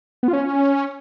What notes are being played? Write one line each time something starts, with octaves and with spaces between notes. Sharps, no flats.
B3
F4
C#4